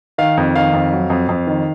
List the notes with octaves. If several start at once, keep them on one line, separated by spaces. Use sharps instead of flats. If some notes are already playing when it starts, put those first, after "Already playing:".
D#3 F5
F2
D#3 F5
F2
F#3
F2
F2
D#3